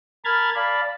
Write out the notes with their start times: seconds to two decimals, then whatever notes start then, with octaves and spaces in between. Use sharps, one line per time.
0.25 A#4 A5 B5 F6 G#6 A6
0.55 D5 F5 A5 B5